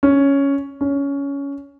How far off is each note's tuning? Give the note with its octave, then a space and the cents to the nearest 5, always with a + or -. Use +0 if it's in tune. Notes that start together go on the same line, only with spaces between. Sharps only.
C#4 +5
C#4 +15